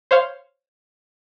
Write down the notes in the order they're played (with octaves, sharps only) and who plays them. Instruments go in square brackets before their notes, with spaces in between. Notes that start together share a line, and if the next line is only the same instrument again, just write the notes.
[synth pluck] C5 C#5 F5 C6